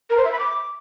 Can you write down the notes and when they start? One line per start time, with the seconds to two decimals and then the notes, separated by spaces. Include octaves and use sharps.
0.10 A#4
0.17 C5
0.25 E5
0.32 B5
0.39 D6